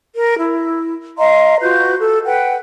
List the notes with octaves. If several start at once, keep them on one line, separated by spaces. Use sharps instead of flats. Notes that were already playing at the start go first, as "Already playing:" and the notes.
A#4
E4
D#5 F5 A#5 C6
F4 F#4 B4 G6
A4
B4 F#5 G5